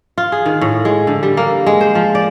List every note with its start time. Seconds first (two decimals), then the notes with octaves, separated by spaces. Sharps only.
0.18 F4
0.32 G#4
0.46 D#3
0.61 A2
0.85 G#3
1.07 D3
1.23 G3
1.37 A#3
1.67 G#3
1.81 C5
1.95 F3
2.15 D5